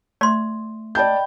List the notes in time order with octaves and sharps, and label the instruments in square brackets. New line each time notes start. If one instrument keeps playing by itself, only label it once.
[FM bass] A3 [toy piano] D5 C6
[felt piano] D5 A5 G6 [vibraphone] D#5 G5 B5